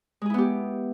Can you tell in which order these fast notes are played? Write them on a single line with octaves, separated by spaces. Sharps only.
G#3 G#4 E4 B3 G4